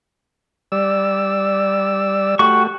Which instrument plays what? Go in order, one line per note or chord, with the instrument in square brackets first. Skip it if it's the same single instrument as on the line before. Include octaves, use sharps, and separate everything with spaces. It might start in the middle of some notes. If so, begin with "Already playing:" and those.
[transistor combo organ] G3 D5 E6
[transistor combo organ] A3 G4 [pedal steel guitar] F#4 C#6